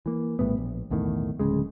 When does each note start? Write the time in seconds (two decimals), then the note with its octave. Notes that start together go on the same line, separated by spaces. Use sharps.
0.06 E3 A#3
0.39 A#1 A2 G3 B3
0.57 A#1
0.91 B1 E2 A2 D#3
1.39 D1 D#2 C#3 G#3